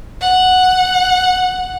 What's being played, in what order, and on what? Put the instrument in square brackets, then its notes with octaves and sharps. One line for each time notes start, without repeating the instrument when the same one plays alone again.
[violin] F#5